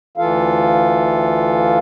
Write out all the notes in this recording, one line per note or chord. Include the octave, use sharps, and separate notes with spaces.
D2 E3 F4 A4 F5